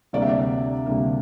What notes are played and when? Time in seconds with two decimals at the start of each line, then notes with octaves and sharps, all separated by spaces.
0.13 D2 C3 G3 A#3 D5
0.22 E5
0.29 D5
0.86 D2 C3 G3 A#3